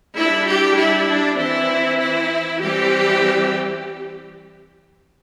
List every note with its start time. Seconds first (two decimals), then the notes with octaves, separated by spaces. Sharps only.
0.17 G3 D4 E4
0.48 G4
0.78 E4
1.08 D4
1.39 E3 C4 E4
1.99 E4
2.61 E3 G3 C4 G4